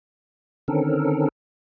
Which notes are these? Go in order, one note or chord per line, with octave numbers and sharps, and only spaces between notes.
D3 D#3 C4 C#4 A4 A#4